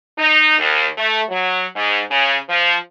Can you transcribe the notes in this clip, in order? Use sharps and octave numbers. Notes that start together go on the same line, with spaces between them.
D#4
D#2
A3
F#3
G#2
C#3
F3